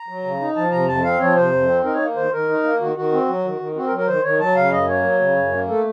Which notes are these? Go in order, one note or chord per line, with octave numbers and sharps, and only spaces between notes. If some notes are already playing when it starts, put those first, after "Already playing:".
Already playing: A#5
F#3
C#3
D#4
F3 A5
C3 A#5
F2 A5
C4 F5
F3 C#5
C3 C5
F2
C4
D#4 A#4
C#5
A#3
D#3 C5
D#3 A#4
D#4
A#3
D#3 F#4
D#3 F#4
C4
F#3
D#3
D#3
C4 F#4
A#4
F#3
A#4
D#3 C5
D#3 C#5
F#3 A5
C#3 F5
F#2 D#5
A#3 C#5
F#3
C#3
F#2
A#3
A3 A4